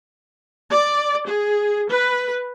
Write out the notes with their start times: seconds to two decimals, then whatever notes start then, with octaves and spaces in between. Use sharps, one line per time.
0.71 D5
1.25 G#4
1.90 B4